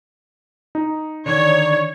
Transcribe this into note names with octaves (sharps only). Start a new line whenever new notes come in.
D#4
D3 D#3 C#5 D5